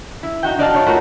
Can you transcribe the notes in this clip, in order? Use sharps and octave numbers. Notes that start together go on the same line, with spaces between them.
E4
D#4 F#4 G5
D#4 F#4 D5 D#5 F5 A5
D#4 C#5
A3 F4 F#4 A#4